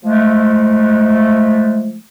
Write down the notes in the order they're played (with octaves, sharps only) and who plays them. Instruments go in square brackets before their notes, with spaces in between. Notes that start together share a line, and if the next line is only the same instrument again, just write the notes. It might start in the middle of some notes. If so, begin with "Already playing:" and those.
[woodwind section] F3 G#3 A3